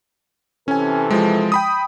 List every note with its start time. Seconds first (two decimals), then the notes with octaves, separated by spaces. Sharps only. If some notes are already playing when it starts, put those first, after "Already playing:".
0.68 C3 E3 C#4 A4 G#5
1.11 F3 G#3
1.52 G5 B5 D#6